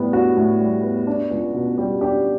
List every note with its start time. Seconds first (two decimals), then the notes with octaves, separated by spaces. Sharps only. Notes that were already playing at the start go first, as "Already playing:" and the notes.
Already playing: A2 G3 B3
0.13 D4 F#4
0.37 A2
0.60 G3
0.83 B3
1.07 D4
1.31 C#2
1.54 B2
1.78 G3
2.01 D4 G4